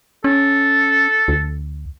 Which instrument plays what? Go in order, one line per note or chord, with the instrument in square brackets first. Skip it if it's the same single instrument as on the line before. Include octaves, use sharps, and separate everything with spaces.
[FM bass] C#4 [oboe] A4
[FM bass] D2